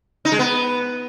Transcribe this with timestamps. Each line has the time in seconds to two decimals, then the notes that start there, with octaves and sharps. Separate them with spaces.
0.25 D#4
0.32 G#3
0.39 B3